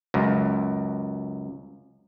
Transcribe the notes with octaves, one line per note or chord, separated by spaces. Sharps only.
C#2 F#2